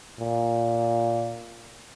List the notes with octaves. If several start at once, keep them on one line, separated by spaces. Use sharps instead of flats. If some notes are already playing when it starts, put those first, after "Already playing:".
A#2